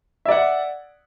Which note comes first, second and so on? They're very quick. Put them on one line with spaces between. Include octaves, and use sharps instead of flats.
E5 D5 F#5